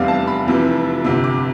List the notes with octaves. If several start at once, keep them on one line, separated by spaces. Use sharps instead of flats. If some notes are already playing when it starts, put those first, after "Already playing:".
Already playing: F1 E2 C3 G3 F5
A5
B5
F1 F2 C3 E3
G1 F2 C3
D6